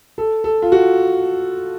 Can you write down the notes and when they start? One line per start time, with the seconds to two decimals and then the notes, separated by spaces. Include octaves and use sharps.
0.18 A4
0.44 A4
0.62 F4
0.72 F#4